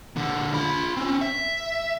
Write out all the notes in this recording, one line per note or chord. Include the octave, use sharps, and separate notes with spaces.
A#2 D3
F4 B5
C4 C#4
E5